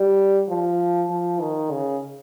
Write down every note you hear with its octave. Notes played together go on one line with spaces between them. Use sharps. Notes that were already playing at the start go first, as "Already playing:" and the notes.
Already playing: G3
F3
F3
D#3
C#3